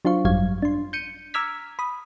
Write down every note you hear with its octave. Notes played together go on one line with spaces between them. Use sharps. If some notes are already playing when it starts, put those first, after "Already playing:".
F#3 D4 F4 C5 F5 C#6
G#1 F#2 F#3 G3 F5 G#6
D4 C6
G6 C#7 D#7
A#5 D6 E6 F6 G#6 B6
B5 D#6